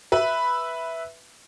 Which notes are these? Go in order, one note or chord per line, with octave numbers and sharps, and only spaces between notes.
B4 E5 B5